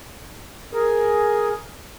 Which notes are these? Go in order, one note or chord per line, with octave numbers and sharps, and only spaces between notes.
G#4 A#4